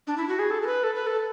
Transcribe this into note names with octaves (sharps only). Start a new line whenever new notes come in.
D4
E4
F#4
G#4
A4
A4
B4
A4
B4
A4